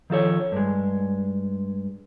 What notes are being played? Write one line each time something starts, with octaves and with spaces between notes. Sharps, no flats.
D#3 F3 A4 C#5
G2 G#3